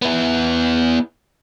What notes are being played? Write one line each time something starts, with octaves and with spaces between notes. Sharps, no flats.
B3 E4